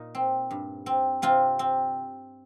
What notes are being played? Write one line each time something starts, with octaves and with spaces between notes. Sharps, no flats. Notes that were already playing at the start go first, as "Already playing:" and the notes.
Already playing: A#2 D#4
C4
G2
C4
C3 C4 F4
C4